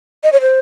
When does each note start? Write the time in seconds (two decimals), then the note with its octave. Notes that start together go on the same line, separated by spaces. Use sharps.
0.24 D#5
0.32 C#5
0.41 C5